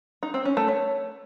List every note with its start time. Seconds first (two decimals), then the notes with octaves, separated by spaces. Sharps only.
0.23 D#4
0.34 C4
0.45 C#4
0.57 A3
0.68 C#5